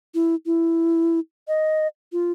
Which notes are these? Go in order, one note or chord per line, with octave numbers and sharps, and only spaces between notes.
E4
E4
D#5
F4